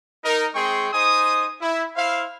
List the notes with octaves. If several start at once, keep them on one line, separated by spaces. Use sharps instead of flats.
D#4 A#4
G#3 C4 G#4 G5 C6 C#6
D#4 C5 G#5 D#6
E4
E4 C5 E5 F5